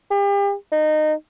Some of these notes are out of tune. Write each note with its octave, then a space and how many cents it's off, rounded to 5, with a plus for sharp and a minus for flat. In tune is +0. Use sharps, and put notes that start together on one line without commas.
G4 +40
D#4 -20